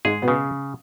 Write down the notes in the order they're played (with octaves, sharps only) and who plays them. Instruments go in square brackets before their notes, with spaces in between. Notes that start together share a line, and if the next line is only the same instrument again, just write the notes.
[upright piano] G#2 G#3 [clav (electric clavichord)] G#4
[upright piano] B2 B3
[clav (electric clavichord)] C#3